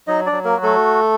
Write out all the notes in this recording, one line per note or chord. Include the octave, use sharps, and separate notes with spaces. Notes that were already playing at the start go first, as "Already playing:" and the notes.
F#3 D#4 D#5
D4 D5
F#3
A#3 A#4
F#4
A3 A4